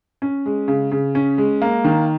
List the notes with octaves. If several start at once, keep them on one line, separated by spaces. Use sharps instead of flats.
C#4
G#3
C#3
C#3
C#4
G#3
A#3
D#3